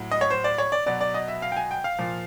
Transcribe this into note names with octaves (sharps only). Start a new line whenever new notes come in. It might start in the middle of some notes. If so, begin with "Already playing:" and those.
Already playing: A2 F#3
D#5
C#5
C5
D5
C#5
D5
B2 F#3 D5
D5
D#5
E5
F5
G5
G#5
G5
F5
A#2 F3